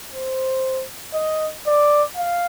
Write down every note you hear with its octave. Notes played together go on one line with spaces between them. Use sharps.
C5
D#5
D5
F5